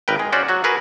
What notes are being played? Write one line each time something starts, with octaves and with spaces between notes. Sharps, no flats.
G#1 A#4 B4 G5
G#3
C#4 F#4 C5 D5
F#3 F#4
F#4 G#4 A#4 B4